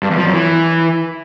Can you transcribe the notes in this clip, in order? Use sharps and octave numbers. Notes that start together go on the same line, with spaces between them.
G2
E2
F3
F#2
E3